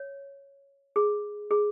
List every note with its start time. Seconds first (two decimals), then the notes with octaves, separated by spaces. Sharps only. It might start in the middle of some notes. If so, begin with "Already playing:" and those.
Already playing: C#5
0.96 G#4
1.51 G#4